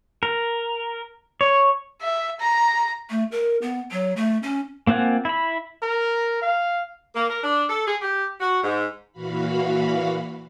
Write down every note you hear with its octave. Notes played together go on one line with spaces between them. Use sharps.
A#4
C#5
E5
A#5
A3
A#4
B3
F#3
A3
C#4
A#3 C4 F4 F#5 G#5
E4 B5
A#4
F5
A#3
A#4
D4
A4
G#4
G4
F#4
G#2
A#2 E3 F#4 F5 B5